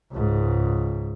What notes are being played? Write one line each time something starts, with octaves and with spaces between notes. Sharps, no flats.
C#2 G#2